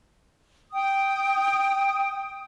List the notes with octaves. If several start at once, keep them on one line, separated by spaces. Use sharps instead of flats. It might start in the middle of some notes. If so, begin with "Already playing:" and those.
G5 D#6